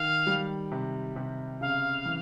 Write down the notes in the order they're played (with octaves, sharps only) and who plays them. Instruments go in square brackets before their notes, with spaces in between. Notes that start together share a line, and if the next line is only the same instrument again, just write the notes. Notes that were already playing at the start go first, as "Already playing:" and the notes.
Already playing: [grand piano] D#3 [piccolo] F5
[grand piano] G3
C3
C3
[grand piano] C#3 [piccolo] F5
[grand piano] E3